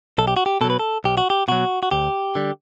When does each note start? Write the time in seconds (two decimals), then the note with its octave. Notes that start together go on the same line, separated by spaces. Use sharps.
0.18 B1 A4
0.27 G4
0.37 F#4
0.46 G4
0.61 B2 F#3 A4
0.70 B4
0.79 A4
1.04 B1 G4
1.17 F#4
1.30 G4
1.48 B2 F#3 F#4
1.83 F#4
1.91 D2 G4
2.35 D3 G3